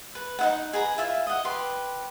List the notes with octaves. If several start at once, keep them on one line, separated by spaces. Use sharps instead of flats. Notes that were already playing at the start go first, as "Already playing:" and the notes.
B4
D#4 E4 F#5
G#4 B4 A#5 B5
E4 F4 E5
D#5 F#5
G4 B4 C6